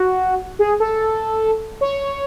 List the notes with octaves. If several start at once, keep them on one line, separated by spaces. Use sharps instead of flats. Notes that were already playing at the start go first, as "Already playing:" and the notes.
Already playing: F#4
G#4
A4
C#5